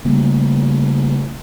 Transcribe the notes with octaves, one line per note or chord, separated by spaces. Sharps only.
C#3 G3 A3 A#3